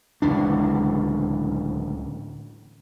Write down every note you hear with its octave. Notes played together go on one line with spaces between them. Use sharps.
D1 C#2 E3 D4